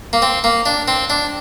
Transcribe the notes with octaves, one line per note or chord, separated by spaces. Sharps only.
A#3
C4
A#3
D4
C4
D4